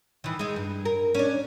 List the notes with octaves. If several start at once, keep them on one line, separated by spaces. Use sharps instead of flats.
D#3 E3
G#3 D#4
G2
A#4
C#4 D4